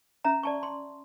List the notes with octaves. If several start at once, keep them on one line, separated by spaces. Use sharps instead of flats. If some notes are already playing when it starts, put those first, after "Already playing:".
C#4 E5 A#5
D5 A5 C#6
C6